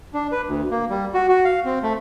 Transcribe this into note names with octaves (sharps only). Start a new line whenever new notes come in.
D4
B4
D2
A#3
G3
F#4
F#4
F5
C4
A3